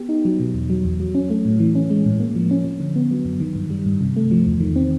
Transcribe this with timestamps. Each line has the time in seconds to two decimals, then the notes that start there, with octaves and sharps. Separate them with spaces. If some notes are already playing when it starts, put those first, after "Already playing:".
Already playing: B3 G4
0.09 D#4
0.25 F#3
0.40 B2
0.54 E2
0.70 F#3
0.84 E2
1.00 F#3
1.15 C#4
1.30 A3
1.45 A2
1.59 E3
1.75 C#4
1.90 G#3
2.06 A2
2.20 A#3
2.35 F3
2.51 C#4
2.65 F3
2.80 D3
2.96 B3
3.11 F#3
3.25 F#2
3.40 D#3
3.56 G2
3.70 G3
3.86 G2
4.01 C3
4.16 A3
4.31 F3
4.47 E2
4.60 D#3
4.76 C4